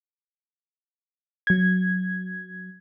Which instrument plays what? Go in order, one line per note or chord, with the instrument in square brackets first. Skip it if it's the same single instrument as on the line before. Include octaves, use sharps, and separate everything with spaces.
[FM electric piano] F#3 G#6